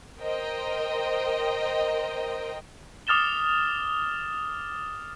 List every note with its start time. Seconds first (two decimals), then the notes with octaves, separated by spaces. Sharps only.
0.21 A#4 C5 D#5 G5
3.07 D6 D#6 F6 A6 E7 G7